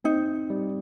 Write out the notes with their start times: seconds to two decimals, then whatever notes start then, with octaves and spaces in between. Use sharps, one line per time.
0.04 C4 D#4
0.50 G3